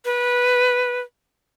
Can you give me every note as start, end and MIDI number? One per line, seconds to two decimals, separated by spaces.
0.05 1.01 71